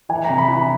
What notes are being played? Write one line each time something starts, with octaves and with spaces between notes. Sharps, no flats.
E3 G#5
A#5
C3
B5
E3
B5